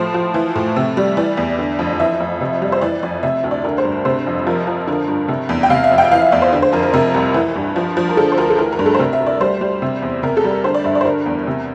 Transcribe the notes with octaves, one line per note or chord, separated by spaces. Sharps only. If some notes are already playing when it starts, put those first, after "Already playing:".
Already playing: A2 F3 C5
F3
E3
A2
C3
G3
E3 D5
E2
D3
F2
E3 E5
F2
C3
G3
C5
E3 D5
F2 D5
C3 E5
D2
D5
D3 A#4
C5
G2
C3 C5
F2
F3 A#4
F3
D3 A#4
G2
C3
E2
G5
C3 F5
E5
F2
G5
E3 F5
E5
E2 D5
C5
D3
C5
F2 A#4
A#4
C3 A#4
C2
E3
G2
F3
F3
A#4
D3 A4
C5
D2 A#4
A4
E3 A#4
A#4
G2
A4
C5
C3 A#4
E5
D2
D5
G3 C5
G3
C3
E2
C3 A#4
A4
G3
A#4
D3 C5
D5
G2 E5
D5
C5
D3 A#4
E2
C3